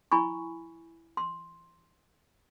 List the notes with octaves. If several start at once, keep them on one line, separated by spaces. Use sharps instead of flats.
E4 G#5 B5 C#6
C6